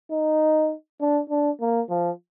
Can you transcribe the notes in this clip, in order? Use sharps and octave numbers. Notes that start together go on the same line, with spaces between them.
D#4
D4
D4
A#3
F3